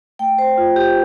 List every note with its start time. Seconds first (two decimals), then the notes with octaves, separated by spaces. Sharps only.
0.19 A3 G5
0.39 C5
0.58 F4
0.76 G4